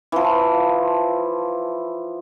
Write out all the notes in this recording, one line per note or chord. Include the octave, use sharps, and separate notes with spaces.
E3 F3